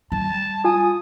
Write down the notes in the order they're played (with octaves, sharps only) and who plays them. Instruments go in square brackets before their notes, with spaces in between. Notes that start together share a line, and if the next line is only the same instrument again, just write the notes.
[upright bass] G3 [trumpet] A5
[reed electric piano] F4 G#5 [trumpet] D#6